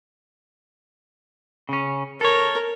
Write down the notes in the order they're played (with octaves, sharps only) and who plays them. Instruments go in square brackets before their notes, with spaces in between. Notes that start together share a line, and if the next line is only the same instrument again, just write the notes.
[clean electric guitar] C#3 C#4
[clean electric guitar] A4 C#5 [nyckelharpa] A#4